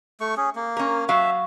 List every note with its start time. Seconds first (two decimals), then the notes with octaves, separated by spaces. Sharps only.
0.21 A3 C#6
0.37 C#4 G#4
0.56 A#3
0.77 C#4 A#4
1.09 F#3 F#4 E5 F5